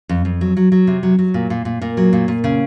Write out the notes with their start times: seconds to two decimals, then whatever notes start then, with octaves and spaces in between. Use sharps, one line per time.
0.09 F2
0.25 F2
0.41 F#3
0.57 F#3
0.72 F#3
0.87 C3
1.03 F#3
1.19 F#3
1.34 A#2
1.50 A#2
1.65 A#2
1.82 A#2 A#3
1.97 F#3
2.13 A#2
2.28 A#2
2.44 C#3